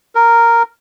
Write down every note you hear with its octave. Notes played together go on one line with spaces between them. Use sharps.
A#4